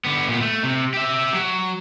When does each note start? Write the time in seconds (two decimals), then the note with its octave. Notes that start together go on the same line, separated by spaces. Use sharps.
0.05 D3 B3
0.29 A#2 B3
0.41 A3
0.63 C3
0.94 G4 E5
1.33 F#3